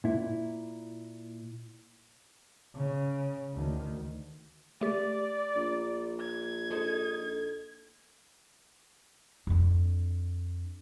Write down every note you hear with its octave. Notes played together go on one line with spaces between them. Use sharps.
A#2 E4
C#3
D2 D#3
A3 G4 D5
A#1
G#6
D#4 A4 C5
F2 D4